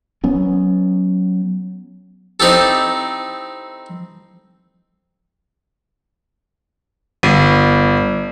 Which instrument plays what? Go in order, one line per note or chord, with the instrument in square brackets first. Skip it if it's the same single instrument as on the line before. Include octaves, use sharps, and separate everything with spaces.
[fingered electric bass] F#3 B3 C#4
[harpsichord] C4 D#4 E4 G4 A4
[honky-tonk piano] G1